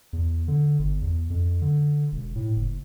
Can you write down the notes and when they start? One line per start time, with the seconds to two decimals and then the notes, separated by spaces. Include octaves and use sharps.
0.13 E2
0.48 D3
0.79 G1
1.01 E2
1.30 F2
1.62 D3
2.12 E1
2.36 A2
2.56 F#1